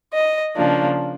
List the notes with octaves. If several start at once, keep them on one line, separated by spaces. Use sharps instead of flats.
D#5
C#3 F3 A#3 D4